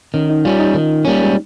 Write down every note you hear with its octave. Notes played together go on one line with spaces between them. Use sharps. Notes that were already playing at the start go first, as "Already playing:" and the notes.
D#3 C#4
D#4
G3 C#4 F4
D#4
D#3
G3 A#3 C#4
G#3